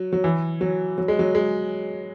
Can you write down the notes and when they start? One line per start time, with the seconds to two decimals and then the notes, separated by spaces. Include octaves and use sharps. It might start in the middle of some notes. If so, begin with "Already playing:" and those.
Already playing: F#3
0.13 F#3
0.24 E3
0.61 F#3
0.98 F#3
1.08 G#3
1.19 F#3
1.35 G#3